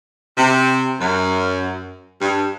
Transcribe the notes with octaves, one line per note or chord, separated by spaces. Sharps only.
C3
F#2
G2